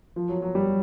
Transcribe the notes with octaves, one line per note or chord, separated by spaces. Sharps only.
F3
F#3
F#3
G3